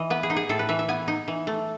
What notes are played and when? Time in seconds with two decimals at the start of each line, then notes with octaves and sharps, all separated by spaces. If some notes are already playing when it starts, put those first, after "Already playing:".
Already playing: E3 D#5
0.10 B3 B4
0.23 G#4
0.30 D#4
0.37 G#4
0.49 A2 A4
0.59 B4
0.69 E3 E5
0.79 E5
0.88 B3 G#5
1.08 D#4
1.28 E3
1.47 A3